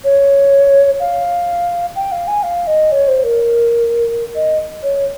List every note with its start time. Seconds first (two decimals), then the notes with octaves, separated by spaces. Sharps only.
0.04 C#5
1.00 F5
1.96 G5
2.12 F5
2.27 G#5
2.43 F5
2.67 D#5
2.91 C#5
3.07 C5
3.23 A#4
4.35 D#5
4.83 C#5